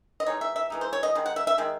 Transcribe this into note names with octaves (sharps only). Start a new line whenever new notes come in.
D#5
E3 G#3 D#4 C#5
E5
E5
E3 G#3 D#4
C5
C#5
D#5
D#3 G#3
F#5
E5
E5
D#3 G#3